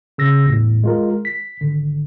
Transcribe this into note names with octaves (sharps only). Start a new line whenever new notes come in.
C#3 E6 A#6
E2 A2
G#3 F4 A#4
B6
G#1 D3